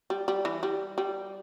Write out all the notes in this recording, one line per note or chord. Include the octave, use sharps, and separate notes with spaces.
G3
G3
E3
G3
G3